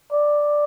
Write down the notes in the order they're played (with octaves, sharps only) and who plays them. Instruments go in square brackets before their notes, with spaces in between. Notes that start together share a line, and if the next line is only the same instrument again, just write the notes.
[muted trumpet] D5